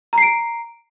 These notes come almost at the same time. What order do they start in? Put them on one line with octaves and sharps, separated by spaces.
A#5 C7 D7